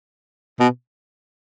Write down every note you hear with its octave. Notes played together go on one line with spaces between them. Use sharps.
B2